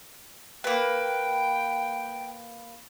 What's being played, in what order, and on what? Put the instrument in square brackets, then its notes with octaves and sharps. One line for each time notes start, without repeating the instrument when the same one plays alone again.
[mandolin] A#3 B4 [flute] G5